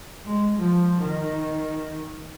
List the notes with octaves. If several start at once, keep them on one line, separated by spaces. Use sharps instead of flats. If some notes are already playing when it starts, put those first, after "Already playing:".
G#3
F3
D#3